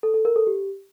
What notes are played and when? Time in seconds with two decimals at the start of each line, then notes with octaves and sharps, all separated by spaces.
0.03 A4
0.14 A4
0.25 A#4
0.36 A4
0.47 G4